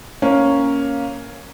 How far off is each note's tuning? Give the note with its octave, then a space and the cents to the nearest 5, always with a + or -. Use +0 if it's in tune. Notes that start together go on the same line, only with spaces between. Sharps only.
A#3 +0 C#4 +0